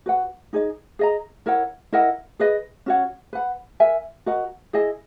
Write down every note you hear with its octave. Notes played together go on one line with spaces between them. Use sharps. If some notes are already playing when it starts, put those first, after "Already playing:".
F#4 B4 F#5
D#4 G#4 D#5
G#4 D#5 A#5
E4 A#4 C#5 F#5
E4 A#4 D#5 F#5
G#4 B4 D#5
C#4 F#4 C#5 F#5
B4 F#5 B5
A#4 E5 G#5
F#4 A#4 D#5 F#5
E4 G#4 D#5 G#5